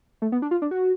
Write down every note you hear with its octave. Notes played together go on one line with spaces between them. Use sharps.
A3
B3
D4
F4
D4
F#4